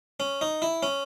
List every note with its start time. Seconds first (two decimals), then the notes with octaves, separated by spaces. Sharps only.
0.20 C#4
0.41 D#4
0.62 E4
0.83 C#4